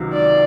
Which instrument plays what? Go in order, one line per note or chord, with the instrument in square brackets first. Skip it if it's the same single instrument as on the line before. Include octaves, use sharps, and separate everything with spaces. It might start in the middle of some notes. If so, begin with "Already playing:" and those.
Already playing: [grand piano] C#2 C3 D#3 F#3
[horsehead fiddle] D5